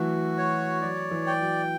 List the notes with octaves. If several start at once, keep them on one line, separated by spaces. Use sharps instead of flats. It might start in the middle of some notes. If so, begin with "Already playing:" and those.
Already playing: E3 F#3 A3 F#4
C#5
F#3 D5
E3
G5
F#3